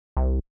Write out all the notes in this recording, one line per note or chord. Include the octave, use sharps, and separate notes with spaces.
C2